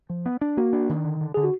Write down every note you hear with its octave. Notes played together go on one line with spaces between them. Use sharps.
F3
B3
D4
A#3 F#4
D4
D#3
D3
D3
D3 G#4
F#4